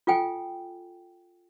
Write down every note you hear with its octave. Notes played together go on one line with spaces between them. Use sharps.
F4 A4 G5 G#5